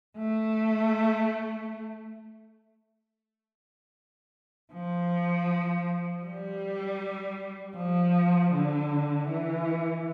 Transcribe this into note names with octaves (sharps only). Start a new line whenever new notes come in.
A3
F3
G3
F3
D3
E3